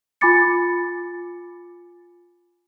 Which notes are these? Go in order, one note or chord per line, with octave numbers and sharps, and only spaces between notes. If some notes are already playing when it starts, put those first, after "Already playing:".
F4 G#5 B5 D6 A6 C#7